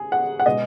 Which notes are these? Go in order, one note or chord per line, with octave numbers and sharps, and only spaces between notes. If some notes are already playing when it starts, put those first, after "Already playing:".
Already playing: G#4
F#5
F#5
B2 G#3 B3 D#5